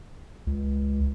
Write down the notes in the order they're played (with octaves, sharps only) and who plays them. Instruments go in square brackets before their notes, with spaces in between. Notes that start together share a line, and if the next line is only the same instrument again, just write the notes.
[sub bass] C#2